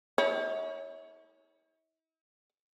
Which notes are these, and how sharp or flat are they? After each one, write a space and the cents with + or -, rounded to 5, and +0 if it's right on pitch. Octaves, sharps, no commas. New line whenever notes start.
E4 -45 C#5 +10